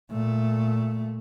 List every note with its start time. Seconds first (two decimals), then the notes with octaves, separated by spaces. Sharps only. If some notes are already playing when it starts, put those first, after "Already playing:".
0.11 A#2 A3